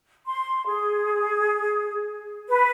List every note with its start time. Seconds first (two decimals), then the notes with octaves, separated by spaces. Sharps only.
0.25 C6
0.66 G#4
2.48 B4